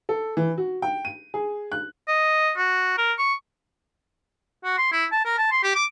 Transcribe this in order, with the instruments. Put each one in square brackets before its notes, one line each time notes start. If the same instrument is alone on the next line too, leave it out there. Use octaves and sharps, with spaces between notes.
[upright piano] A4
E3
F#4
G5
D#7
G#4
F#6
[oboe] D#5
F#4
A#4
C#6
[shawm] F#4
C6
E4
A5
A#4
A5
C6
G4
D6